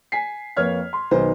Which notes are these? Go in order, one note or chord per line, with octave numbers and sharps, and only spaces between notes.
G#5 B6 C7
F2 A#3 B4 C#5 F6 G#6
C6
B1 D#3 B3 C5